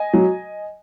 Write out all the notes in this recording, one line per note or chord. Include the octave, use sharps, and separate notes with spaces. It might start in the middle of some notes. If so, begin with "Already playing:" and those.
Already playing: D#5 G#5
F#3